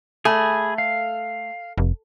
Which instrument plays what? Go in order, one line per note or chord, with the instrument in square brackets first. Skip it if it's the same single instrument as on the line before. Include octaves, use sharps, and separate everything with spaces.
[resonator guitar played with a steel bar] A3 [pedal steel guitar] G#4 G#5 B5
[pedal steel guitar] F5
[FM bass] F1